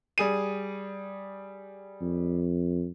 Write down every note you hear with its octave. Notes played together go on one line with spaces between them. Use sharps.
G3 G#4 D#7
F2